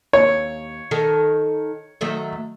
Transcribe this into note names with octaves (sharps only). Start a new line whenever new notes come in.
D#2 C#5
D#3 A4
D#3 F#3 A3